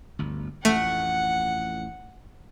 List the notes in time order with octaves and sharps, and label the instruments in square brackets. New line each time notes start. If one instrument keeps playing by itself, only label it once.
[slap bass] G1 D2
[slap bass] A1 F2 [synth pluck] A3 [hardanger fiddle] F#5